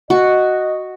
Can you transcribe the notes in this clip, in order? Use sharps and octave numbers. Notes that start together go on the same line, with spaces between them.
F#4 D#5